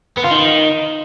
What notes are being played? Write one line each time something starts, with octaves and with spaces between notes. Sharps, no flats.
B3
F4
D#3